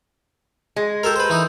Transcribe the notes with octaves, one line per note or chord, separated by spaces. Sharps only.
G#3
G4 A4 A#4
B4 C5
E3 D#4